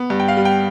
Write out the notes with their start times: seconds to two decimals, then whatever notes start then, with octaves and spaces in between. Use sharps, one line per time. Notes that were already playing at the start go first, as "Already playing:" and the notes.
Already playing: B3
0.10 G2
0.20 G5
0.28 F5
0.37 G3
0.45 G5